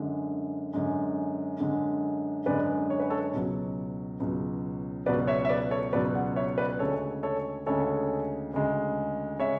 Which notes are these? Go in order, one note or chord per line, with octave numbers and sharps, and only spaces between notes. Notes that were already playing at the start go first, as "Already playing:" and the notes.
Already playing: F#2 D3 G#3
F#2 D3 G#3
F#2 D3 G#3
F#2 D3 G#3 B4 D5
C#5
B4
A4 C#5
C#2 B2 F#3
C#2 B2 F#3
C#2 B2 F#3 B4 D5
C#5 E5
E5
B4 D5
A4 C#5
C#2 B2 F#3 B4 D5
D5 F#5
C#5 E5
B4 D5
D2 C#3 G#3 A4 C#5
A4 C#5
D2 C#3 G#3 A4 C#5
D2 C#3 G#3
C#3 G#3 C#5 E5